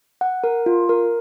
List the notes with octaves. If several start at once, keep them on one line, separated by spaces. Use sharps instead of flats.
F#5
A#4
F4
A#4